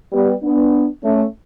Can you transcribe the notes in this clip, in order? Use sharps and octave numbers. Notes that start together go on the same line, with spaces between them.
G3 B3
B3 D4
A3 C#4